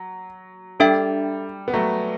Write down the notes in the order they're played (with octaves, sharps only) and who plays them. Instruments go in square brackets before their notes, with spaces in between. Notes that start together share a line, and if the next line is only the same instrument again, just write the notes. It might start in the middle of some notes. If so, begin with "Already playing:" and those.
Already playing: [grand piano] F#3
[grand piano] G3 [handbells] D4 A4 E5 G5
[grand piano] B3
F#3 A3